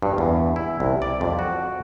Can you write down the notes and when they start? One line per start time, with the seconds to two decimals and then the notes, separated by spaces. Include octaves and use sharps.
0.02 G2
0.18 E2
0.56 E4
0.80 C2
1.02 D5
1.21 F2
1.39 F#4